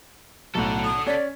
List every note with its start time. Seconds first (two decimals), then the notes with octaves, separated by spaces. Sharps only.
0.55 B1 A2 A4 F#5
0.85 D#6
1.06 C#4 D5 B6